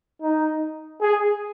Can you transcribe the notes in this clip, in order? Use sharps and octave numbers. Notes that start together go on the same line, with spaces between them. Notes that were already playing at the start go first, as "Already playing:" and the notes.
D#4
G#4